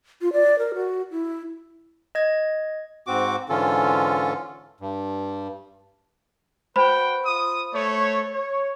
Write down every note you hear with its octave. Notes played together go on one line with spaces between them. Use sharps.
F4
D5
A#4
F#4
E4
D#5 G#6
G#2 C4 F#4 D6
G#2 D3 E3 C#4 F4 A4
G2
F#4 B4 C5 G5 B5
F4 D#6
A3 C#5
C#5